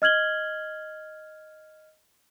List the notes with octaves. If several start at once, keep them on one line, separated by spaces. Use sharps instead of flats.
D#5 F6 G#6 F#7 G7